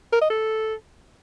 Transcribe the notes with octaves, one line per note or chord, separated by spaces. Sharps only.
A#4
D#5
A4